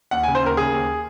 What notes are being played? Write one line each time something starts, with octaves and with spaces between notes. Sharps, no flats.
D#2 F#5
C#3 G#5
C5
D#2 A#4
C#3 G#4
D#2